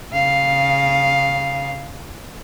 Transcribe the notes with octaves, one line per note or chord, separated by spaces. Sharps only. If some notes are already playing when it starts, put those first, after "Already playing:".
C#3 F5